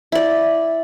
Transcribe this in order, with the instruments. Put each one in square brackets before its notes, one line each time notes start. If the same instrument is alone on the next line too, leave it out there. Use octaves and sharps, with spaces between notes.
[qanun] E4 D5